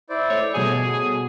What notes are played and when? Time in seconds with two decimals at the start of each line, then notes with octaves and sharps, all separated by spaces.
0.10 E4 C5 D5
0.30 A3 C#5
0.54 B2 G3 G#4 A4 G#5